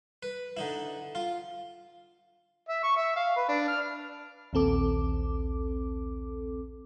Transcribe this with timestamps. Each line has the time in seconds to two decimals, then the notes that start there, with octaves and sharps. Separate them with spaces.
0.23 B4
0.57 D3 D#4 E4
1.15 F4
2.69 E5
2.84 C#6
2.97 E5
3.16 F5
3.37 B4
3.49 D4
3.68 F6
4.53 A#1 D#2 C4 A4 D6